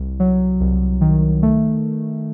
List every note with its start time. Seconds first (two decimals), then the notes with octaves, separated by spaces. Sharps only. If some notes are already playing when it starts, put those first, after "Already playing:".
Already playing: C2
0.20 F#3
0.60 C2
1.01 D#3
1.43 A3